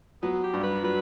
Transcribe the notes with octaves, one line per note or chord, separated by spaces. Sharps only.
F#3 B3
G4
G2
B4
F#3 B4